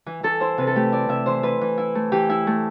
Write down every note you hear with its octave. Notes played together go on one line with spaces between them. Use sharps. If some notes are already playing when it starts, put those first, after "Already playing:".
E3
E3 A4
E4 C5
C3 B4
A4
A3 G4
E4 D5
C3 E5
E3 C5
E3 B4
E3
E4
A3
E3 G4
E4
A3